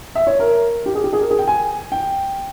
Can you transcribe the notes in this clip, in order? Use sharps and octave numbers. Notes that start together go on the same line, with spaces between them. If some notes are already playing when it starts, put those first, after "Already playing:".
E5
C#5
A#4
G4
G#4
G4
G#4
A#4
G#4
G5
G#5
G5